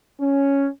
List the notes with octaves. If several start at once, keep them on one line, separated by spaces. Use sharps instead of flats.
C#4